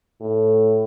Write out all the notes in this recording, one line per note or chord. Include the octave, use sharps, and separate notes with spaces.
A2